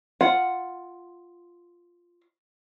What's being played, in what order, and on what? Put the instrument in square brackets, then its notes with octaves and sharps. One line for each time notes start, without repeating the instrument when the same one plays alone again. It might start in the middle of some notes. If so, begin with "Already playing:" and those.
[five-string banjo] F4 F#5